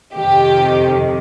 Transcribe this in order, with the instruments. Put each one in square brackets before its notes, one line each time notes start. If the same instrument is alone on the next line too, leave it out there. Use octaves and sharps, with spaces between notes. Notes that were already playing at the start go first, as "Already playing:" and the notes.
[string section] F2 C3 D#3 G4